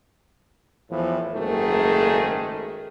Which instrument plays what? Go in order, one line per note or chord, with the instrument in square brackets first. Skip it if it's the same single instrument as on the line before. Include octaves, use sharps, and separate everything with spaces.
[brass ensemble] E2 A2 E3 F3
F#1 G#2 D#3 A3 G#4